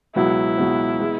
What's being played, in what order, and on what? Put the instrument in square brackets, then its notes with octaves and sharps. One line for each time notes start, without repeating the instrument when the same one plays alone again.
[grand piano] C#2 B2 F#3 B3 [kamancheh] E4
[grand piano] C#2 B2 F#3 B3
G#3 B3